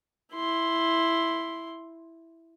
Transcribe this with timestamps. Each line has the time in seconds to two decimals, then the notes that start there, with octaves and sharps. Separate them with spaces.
0.34 E4 C6